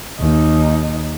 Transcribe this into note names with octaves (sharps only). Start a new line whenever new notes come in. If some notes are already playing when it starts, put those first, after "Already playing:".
D#2 D#4